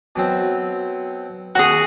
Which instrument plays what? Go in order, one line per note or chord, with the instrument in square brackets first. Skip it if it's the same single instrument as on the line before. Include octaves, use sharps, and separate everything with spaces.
[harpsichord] B2 F#3 C4
[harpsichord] D#2 A#5 [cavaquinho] F#4 G#4